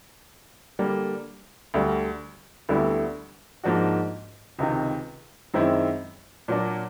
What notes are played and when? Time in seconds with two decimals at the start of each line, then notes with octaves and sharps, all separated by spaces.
0.79 D3 G3 A#3
1.74 D2 D3 G3
2.69 D2 D3 G3 B3 E4
3.64 G#2 F3 A#3 D4 F#4
4.59 C#2 C3 D#3
5.54 F#2 D#3 G#3 C4 E4
6.48 A#2 F#3 A#3 D4